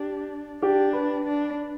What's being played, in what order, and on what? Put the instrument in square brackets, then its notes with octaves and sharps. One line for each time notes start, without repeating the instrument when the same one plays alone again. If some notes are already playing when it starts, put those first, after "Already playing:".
Already playing: [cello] D4 [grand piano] G4
[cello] D4 [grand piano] G4
[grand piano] B4
[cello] D4